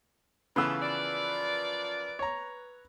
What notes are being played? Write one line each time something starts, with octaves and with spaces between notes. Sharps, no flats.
C#3 E3 A3 B3 F4 B4 E6
F3 A#4 D5
C#5 A#5